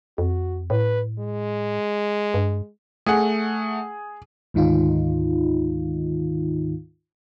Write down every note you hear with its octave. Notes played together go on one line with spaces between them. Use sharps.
F2 F#4
A2 B4
G#3
G2
A3 G#4 F#5
D2 G#2 D#3 D#4 F4